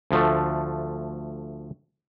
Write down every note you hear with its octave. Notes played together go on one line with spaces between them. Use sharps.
D2 F3 A3